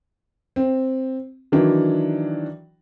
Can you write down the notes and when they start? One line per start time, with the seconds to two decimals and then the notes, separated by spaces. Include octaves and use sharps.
0.56 C4
1.52 D#3 E3 F#3 D4